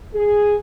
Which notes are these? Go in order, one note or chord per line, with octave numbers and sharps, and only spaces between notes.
G#4